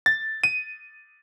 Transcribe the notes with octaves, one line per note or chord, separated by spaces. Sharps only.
A6
D#7